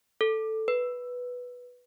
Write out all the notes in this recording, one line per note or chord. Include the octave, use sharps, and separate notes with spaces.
A4
B4